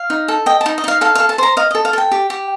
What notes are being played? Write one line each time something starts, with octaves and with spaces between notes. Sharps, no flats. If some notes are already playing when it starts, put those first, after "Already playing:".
Already playing: F5
D#4
A4
D#5 G5
A5
D#4
D#5
D#4 F5
A4 F5
A4 F5
A5
C5 A#5
D#5 F5
A4 D#5
F5
A4 G5
G4
G4